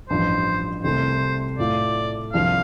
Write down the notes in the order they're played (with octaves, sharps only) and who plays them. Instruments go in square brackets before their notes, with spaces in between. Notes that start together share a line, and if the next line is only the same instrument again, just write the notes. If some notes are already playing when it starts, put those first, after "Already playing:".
[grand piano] A1 G2 F3 [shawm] C5
[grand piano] C2 C3 A3 C4 [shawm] C5
[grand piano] A2 A3 F4 [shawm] D5
[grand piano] C2 C3 F3 D4 [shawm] F5